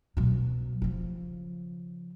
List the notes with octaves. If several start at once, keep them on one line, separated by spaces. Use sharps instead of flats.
B2 F#3
C#3 F3